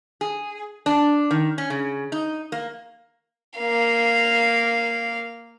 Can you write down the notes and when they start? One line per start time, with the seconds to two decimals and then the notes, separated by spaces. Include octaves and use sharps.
0.21 G#4
0.86 D4
1.31 D#3
1.58 C#4
1.70 C#3
2.12 D#4
2.52 A#3
3.59 A#3 F5